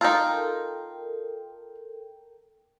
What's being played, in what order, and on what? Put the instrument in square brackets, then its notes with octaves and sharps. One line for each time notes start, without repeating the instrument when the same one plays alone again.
[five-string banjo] D#4 F4 [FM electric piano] A4 A#4 G5